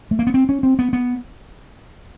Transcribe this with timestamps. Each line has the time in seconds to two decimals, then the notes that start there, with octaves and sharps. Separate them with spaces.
0.11 A3
0.19 A#3
0.27 B3
0.34 C4
0.49 C#4
0.63 C4
0.79 B3
0.93 B3